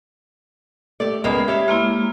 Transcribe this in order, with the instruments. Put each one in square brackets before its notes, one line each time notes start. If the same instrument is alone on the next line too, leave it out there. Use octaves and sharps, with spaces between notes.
[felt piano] A3 [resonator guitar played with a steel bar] G4 D5
[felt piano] C#2 B3 [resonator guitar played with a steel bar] G#3 A#3 A#4 [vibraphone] B5
[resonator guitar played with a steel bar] G4 C#5 [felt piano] E5
[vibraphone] G#3 A#3 E4 [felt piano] C6 F6